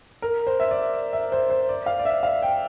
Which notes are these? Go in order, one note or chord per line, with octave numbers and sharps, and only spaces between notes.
A#4
C5
E5
D5
E5
C5
C5
D5
F5
D5
E5
F5
G5